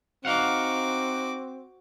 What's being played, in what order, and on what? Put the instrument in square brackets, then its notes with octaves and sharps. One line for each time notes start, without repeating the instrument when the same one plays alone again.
[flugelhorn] C4 [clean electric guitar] D#4 F5 F#5 [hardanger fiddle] F#4 D6